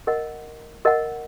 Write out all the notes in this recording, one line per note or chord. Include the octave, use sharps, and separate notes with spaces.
A#4 D#5 F#5
A#4 D#5 F#5